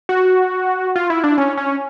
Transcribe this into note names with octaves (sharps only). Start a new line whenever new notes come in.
F#4
F4
E4
D4
C#4
C#4